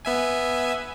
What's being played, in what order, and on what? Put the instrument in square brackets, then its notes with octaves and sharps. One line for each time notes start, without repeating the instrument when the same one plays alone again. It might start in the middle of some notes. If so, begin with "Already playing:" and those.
[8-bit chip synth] B3 E5 G#5